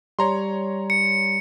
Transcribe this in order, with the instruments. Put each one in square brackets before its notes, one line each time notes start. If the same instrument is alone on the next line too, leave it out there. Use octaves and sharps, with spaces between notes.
[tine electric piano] G3 [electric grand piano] C#5 A#5 C6
[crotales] C#7